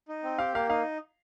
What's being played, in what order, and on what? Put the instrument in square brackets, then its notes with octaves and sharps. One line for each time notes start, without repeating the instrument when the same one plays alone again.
[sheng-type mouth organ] D#4
C4
[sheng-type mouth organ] G4 [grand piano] F5
[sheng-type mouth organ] A#3 [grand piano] F5
[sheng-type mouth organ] D#4 [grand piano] F5